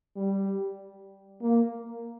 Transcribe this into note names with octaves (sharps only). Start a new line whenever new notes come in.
G3
A#3